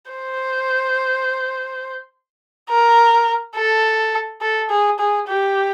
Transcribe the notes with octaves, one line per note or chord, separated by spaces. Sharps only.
C5
A#4
A4
A4
G#4
G#4
G4